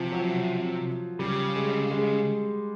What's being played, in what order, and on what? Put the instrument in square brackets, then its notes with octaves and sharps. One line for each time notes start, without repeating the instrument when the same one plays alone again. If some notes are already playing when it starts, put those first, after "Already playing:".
Already playing: [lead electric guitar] C3 [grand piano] F3
[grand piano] F#3
[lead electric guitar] C#3 [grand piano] G3
[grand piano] G#3
G#3